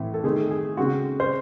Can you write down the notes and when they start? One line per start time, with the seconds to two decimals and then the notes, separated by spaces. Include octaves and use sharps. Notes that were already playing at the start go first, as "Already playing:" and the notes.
Already playing: A2 E3 A3 C4
0.14 A4
0.24 D#3 A3 C4 G#4
0.51 G#4
0.77 C#3 G#3 C4 F#4
1.20 C5